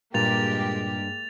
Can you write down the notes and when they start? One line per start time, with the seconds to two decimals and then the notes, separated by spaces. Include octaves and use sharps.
0.14 G2 A#2 G#3 A#3 G4 A6 F7